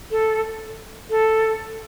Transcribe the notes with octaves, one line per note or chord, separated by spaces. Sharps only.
A4
A4